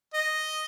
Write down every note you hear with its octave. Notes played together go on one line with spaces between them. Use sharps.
D#5